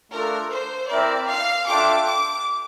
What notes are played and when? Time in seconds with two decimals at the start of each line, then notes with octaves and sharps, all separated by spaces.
0.12 A3 D4 F4 A4 A#4
0.51 C5
0.90 C4 E4 A#4 D5 E5
1.29 F5
1.68 D4 F4 A4 E5 G5 D6
2.07 D6